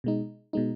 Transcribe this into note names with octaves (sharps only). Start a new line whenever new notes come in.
B2 G#3 D#4
B2 G#3 D#4